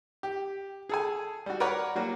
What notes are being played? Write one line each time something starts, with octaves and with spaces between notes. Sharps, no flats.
G4
G#4 A4 G#5
G3 F#4
A#4 B4 C#5 D5 F#5
F#3 G3 A#3 F#4